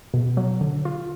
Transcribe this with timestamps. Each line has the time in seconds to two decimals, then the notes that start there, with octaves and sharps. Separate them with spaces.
0.14 B2
0.37 F#3
0.61 D3
0.85 F4